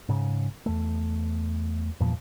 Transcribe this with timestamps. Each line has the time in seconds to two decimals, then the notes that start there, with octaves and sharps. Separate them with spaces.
0.09 G#2 C#3
0.66 E2 A3
2.00 E2 G2 A#2 F3